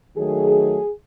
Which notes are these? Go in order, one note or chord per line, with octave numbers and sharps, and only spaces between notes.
D#3 F#3 A3 G#4